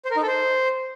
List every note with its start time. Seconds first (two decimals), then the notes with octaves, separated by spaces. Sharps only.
0.05 C5
0.11 A#4
0.16 D#4
0.22 A4
0.28 C5